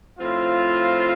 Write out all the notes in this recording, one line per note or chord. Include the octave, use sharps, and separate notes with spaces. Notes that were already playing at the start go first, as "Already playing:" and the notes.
A2 F3 C4 F4